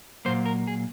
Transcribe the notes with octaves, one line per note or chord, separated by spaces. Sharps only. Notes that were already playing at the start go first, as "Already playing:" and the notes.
A#2 F#3 A#3 C5
A#4
G#4